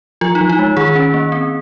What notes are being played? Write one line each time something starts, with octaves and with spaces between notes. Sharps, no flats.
F3 F4
D#4
F3
D#4
G#3
D#3 G#4
C#4
A#3
C4